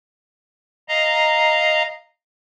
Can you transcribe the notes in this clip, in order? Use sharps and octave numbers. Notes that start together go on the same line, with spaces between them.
D#5 F5 A#5